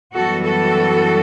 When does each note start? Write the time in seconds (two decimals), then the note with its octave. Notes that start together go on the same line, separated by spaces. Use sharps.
0.14 F#2 E3 G3 B3 F#4 A4
0.45 F#4 A4